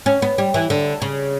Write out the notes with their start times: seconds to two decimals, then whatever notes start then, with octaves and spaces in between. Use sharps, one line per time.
0.06 C#4
0.22 B3
0.38 G3
0.54 E3
0.70 D3
1.02 C#3